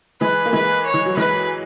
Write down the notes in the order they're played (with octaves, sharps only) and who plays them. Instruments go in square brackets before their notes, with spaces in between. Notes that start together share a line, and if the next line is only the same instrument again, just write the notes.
[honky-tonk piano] E3 G#3 [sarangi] B4
[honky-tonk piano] A#3
[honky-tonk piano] E3 G#3 [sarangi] B4
[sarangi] C#5
[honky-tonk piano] E3
F#3
[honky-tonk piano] E3 G#3 [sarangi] B4